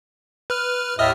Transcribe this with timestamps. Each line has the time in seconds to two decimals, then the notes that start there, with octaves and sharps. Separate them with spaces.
0.50 B4 F6
0.99 D#2 A2 D#5 E5 D#6 F6